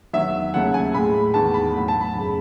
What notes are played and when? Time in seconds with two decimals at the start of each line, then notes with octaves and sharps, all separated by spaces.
0.13 E2 D#3 F#3 E5
0.54 D#2 C#3 F#3 A3 F#5
0.74 G#5
0.94 A2 G#3 B5
1.34 E2 D#3 G#3 A5
1.54 B5
1.75 A2 F#3 A3
1.88 A5
2.01 B5
2.15 F#2 C#3 G#3